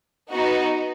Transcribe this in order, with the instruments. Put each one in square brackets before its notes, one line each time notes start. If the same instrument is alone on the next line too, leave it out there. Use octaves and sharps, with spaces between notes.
[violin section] B3 D#4 F#4